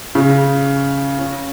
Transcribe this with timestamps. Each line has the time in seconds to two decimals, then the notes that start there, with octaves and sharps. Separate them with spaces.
0.15 C#3
1.18 C#4